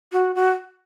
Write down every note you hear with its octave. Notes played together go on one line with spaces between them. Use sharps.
F#4
F#4